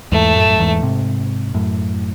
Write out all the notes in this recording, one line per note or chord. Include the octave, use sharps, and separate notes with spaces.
E2 G#2 A3
F#2 A2
F#2
E2 G#2
G#2 C3
F#2 A2